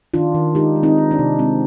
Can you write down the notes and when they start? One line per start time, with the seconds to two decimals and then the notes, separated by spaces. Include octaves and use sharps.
0.14 D#3 D4 F4
0.35 D#3
0.55 G#3 D#4 G4
0.76 G#3
0.83 C4 D#4
0.98 C4
1.11 D4
1.19 C3
1.39 G#3 C4